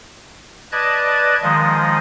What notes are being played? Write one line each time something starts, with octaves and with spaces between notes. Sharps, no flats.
B4 D5 D#5 A5 F#6 G#6
D#3 F3 G#3 D#5